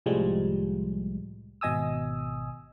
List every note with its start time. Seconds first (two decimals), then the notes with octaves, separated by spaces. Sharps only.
0.06 C2 A2 F3 G3 G#3
1.61 G#1 B2 D#5 G#5 D#6 E6